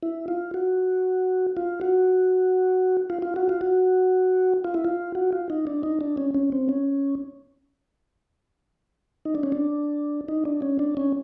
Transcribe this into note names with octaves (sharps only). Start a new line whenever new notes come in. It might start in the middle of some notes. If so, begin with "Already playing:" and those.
E4
F4
F#4
F4
F#4
F4
F4
F#4
F4
F#4
F4
E4
F4
F#4
F4
D#4
D4
D#4
D4
C#4
C#4
C4
C#4
D#4
D4
C#4
D4
D#4
D4
C#4
D4
C#4